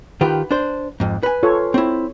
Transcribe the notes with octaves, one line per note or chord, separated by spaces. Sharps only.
D#3 F4 G4 B4
D4 C5
F2 G#2
B4 G#5
F4 A4 C#5
C4 E4 C#5